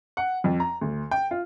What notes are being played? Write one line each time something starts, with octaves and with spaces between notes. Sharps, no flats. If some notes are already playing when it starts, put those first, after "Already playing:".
F#5
F2
A#5
D2
G5
F4